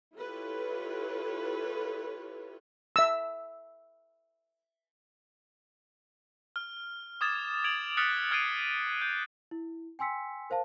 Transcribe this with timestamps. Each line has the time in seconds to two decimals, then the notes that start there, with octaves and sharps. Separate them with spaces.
0.15 E4 F4 G4 A4 B4 C#5
2.96 E5 E6
6.56 F6
7.21 D6 D#6 G#6 A6 E7
7.64 G#6 D7 F7 F#7
7.97 D#6 F6 F#6 A6 B6 C#7
8.31 F6 G#6 A6 C7 D7 D#7
9.02 G6
9.51 E4
9.99 G5 G#5 C6 E6 B6 C#7
10.50 A#4 C5 F5 A5